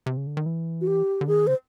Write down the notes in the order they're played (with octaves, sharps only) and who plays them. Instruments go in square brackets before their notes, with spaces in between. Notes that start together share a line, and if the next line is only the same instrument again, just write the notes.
[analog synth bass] C3
C#3
D3
D#3
E3
[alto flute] F#4
G4
[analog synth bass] D3
[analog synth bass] D#3 [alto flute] G#4
[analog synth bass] C#3 [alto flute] C5